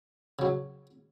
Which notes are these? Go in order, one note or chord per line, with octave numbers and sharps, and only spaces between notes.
C#3 F#3